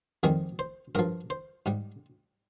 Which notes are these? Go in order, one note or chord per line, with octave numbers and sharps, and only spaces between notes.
F2 D#3 G3 G#4
C5
G2 F3 A#4
C5
G#2 G3